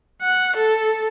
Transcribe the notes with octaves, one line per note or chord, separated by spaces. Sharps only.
F#5
A4